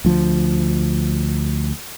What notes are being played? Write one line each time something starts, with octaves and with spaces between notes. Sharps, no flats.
D2 F3